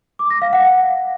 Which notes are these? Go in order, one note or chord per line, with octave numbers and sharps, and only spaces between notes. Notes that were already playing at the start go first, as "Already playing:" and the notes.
D6
A#6
F5
F#5